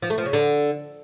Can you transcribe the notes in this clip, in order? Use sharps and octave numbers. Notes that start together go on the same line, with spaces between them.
F3
A3
F3
C#3
D3